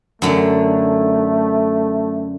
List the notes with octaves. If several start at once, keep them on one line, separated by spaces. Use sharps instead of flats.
F#2 D3 A3